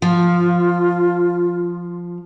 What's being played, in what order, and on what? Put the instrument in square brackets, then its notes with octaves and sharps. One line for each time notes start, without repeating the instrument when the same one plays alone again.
[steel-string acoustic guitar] F3 [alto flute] F4